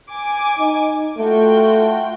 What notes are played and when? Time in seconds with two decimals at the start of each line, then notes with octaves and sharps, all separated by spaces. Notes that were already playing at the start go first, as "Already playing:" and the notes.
0.10 G#5 D6
0.59 D#4
1.18 A3 F4 F#4 G5